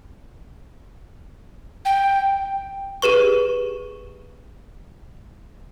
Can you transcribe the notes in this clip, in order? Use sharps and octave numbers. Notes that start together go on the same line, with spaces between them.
G5
G4 G#4 B4 C#6